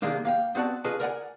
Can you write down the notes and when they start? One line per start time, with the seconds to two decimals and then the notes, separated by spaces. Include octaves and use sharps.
0.02 C3 D#3 G#3 A#3 D4
0.25 A#3 F5 G5
0.55 B3 C4 F#4 D5 A5
0.84 C#4 F4 G#4 A4 B4 D#5
1.00 A#4 D5 F#5 G#5